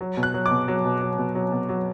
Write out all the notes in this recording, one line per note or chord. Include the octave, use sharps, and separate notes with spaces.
F#3
B2
F#6
F#3
D6
B2
F#3
B2
F#3
B2
F#3
B2
F#3